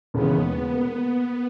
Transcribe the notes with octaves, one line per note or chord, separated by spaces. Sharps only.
D#2 C#3 E3 G#3 B3
A#3